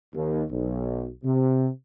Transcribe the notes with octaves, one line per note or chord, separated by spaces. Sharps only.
D#2
B1
C3